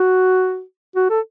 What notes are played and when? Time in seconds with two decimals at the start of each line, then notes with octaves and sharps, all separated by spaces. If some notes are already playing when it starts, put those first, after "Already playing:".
Already playing: F#4
0.96 F#4
1.10 A4